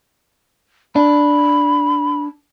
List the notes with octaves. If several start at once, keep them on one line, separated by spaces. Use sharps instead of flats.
D4 B5